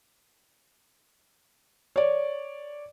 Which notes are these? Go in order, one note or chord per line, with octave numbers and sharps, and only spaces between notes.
C#5 D5